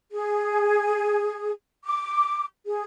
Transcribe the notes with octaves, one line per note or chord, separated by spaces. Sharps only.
G#4
D6
G#4